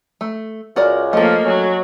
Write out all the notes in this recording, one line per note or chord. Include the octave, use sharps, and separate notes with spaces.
A3
C#2 F#4 A#4 D5
F3 A3 A#3 A4 D#5
F#3 C#4